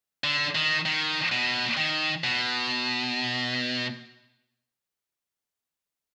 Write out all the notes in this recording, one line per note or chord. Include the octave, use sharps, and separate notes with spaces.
D3
D#3
D#3
B2
D#3
B2